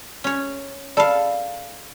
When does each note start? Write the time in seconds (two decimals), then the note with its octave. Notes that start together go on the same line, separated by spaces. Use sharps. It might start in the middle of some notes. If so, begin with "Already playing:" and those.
0.24 C#4 C#5
0.97 A4 D5 F5 A5 B5